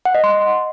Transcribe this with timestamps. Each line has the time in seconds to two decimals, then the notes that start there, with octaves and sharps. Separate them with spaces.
0.05 F#5
0.15 D#5
0.24 C6